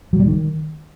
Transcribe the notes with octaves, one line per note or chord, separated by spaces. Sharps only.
F#3
G3
D#3